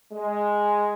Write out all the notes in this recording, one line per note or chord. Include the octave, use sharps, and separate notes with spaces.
G#3